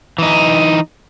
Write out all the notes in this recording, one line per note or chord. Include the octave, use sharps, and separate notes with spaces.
E3 D#4